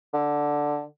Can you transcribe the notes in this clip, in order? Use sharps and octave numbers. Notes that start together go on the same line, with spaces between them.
D3